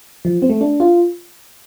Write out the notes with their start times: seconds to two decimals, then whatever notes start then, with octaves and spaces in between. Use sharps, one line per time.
0.25 F3
0.42 C4
0.49 A3
0.61 D4
0.80 F4